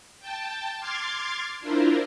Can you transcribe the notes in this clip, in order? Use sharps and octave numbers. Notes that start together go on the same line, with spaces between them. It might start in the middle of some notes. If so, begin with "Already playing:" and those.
G5 A5
C6 D6 F6 G#6 A6 C7
D4 E4 F4 A#4 C5